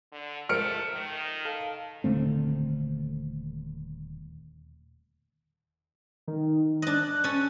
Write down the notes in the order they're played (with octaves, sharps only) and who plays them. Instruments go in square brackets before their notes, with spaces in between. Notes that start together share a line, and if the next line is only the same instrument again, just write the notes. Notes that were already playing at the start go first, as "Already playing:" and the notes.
[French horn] D3
[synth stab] F3 G#3 A#4 [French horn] A3 [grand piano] F6 C#7 D7
[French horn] D#3
[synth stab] A4 F5
[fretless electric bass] D#1 D3 A3 C4
[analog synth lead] D#3
[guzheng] D4 D#5 [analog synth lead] F#6
[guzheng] C#4 A4